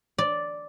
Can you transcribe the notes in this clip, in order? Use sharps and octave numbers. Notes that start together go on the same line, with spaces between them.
D5